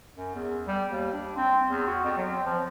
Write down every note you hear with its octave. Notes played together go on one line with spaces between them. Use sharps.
F#2
E2
G3
D#2
D4
C4
E2
F#4
F2
F#3
C4
F3